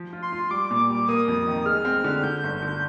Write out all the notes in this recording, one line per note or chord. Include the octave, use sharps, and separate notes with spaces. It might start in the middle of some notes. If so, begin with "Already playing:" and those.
Already playing: F3
F4
C6
F4
G3 D6
A#2
G3
A#3 D#6
F2
D#3
G#3 F6
C4
D3
D3 G6
G1
D3